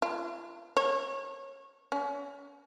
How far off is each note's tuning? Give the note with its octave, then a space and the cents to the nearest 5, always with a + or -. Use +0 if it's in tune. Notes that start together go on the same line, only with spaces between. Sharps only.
F4 -40
C#5 -30
C#4 +35